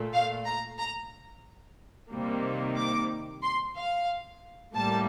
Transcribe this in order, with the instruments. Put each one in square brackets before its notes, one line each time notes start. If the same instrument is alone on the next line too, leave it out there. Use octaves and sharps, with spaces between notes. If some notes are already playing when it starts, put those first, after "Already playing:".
Already playing: [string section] A#2 A3
F5
A#5
A#5
C3 D#3 G3 A#3
D6
C6
F5
A2 G3 A#3 A5